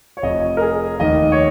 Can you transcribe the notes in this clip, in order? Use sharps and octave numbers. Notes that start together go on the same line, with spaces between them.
C#5
F1 F2 F3 D#5
A#4
G#4
F1 D#2 D#3 D#5
C#5